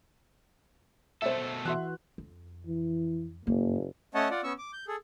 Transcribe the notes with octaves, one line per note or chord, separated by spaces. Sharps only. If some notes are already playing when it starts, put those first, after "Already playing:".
B2 A3 A4 C5 E5
E3 F#4 E5 C6 F#6
F2
E3
F#1 G2 A#3
A3 C#4 C#5 D#5 F#5 A5
F4 D5 F#5
B3 C#4 C#6 E6
D6
G6
G#4 A4